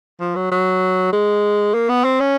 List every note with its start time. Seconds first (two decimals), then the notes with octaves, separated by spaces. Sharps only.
0.20 F3
0.35 F#3
0.51 F#3
1.13 G#3
1.74 A#3
1.89 B3
2.04 C4
2.20 C#4